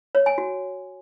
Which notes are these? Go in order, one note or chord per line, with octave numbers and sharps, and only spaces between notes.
C#5
G#5
F#4